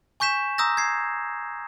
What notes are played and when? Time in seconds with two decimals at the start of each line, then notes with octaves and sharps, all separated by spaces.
0.20 G#5 C#6 G6 B6 E7
0.58 A#5 D#6 E6 G6 A#6
0.77 G#6 C7